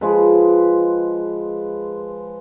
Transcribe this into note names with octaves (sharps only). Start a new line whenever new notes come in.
F3 G#3 B4